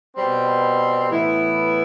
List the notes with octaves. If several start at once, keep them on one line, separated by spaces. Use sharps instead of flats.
B2 G3 C4
A2 E3 B3 E4